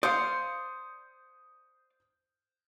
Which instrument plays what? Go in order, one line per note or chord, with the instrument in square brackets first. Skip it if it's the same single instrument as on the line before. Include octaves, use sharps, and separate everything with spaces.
[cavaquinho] C5 [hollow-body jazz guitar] D5 F5 [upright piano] D#6 G6 C#7